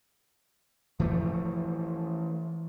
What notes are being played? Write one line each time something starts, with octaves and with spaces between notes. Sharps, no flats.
E3 F3 A3